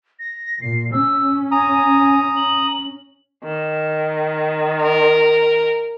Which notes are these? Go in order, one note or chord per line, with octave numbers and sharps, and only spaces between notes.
A#6
A#2 C7
C#4 E6
G#5 A#5 D#6
F#7
D#3
A#4